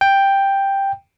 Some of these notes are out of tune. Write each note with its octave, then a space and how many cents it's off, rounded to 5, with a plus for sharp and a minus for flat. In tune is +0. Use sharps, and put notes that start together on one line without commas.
G5 +5